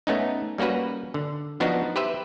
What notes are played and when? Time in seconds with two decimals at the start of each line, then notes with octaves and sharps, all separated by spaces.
0.07 A3 B3 C#4 D#4
0.58 G3 A#3 C#4 F#4 B4
1.14 D3
1.60 F3 B3 D4 D#4 F#4
1.96 G4 B4 C5 E5